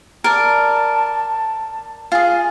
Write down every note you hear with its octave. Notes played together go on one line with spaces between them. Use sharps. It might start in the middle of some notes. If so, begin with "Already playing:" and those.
A#4 D5 A5
F4 G#4 G#5